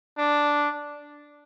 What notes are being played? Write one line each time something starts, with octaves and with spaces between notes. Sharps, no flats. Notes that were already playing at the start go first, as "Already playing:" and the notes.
D4